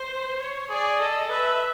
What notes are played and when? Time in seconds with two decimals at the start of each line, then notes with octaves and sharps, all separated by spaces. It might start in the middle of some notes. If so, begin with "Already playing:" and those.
Already playing: C5
0.40 C#5
0.70 G#4 D5
0.99 A4 D#5
1.30 B4 E5